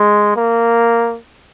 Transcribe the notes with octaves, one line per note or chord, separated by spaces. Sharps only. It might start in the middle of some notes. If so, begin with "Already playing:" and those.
Already playing: G#3
A#3